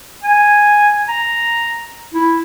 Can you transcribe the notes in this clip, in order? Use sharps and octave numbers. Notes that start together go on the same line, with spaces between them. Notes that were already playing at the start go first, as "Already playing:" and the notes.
G#5
A#5
E4